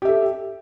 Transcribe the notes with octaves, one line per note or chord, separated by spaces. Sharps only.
G4 A4 E5